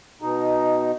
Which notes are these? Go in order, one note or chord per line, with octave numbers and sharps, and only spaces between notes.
B2 D#4